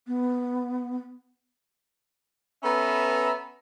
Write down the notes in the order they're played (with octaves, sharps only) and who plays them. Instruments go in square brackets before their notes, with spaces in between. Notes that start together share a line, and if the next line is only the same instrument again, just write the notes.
[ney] B3
[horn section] B3 C#4 A4 B4 E5 A#5